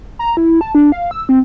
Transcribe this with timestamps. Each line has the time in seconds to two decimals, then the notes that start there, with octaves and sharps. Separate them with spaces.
0.19 A#5
0.37 E4
0.61 A5
0.75 D4
0.92 F5
1.11 E6
1.29 C4